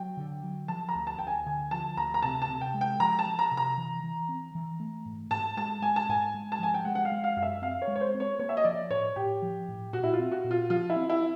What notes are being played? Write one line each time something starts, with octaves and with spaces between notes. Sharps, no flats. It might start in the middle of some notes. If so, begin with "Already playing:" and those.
Already playing: F#3 G5
D3
F#3
F3 A5
A#5
D2
A5
D2 G5
G#5
D3 G#5
F3 A5
D2 A#5
A#5
C3 A5
A5
C3
G5
G#3
G5
F3 A#5
A5
F3
A#5
C3
A#5
E3
E3
C4
E3
A3
G#2
G#2 A5
G#3 A5
G#3 G#5
A5
G#2 G#5
G#3
A5
F3 G#5
G5
G#3 F#5
F#5
F5
G#3
F5
F#2 F5
E5
C4 F5
C#5
G#3
C#5
C5
C4
C#5
A#3 C#5
E5
D#5
F3 D5
A2 C#5
A2 G4
F3
A2
A#2 F#4
E4
F4
C4
F#4
A#2
F4
F3 F4
E4
C4
E4